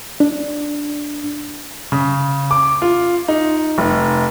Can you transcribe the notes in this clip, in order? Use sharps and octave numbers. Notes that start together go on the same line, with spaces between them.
D4
C#3
D6
F4
D#4
F1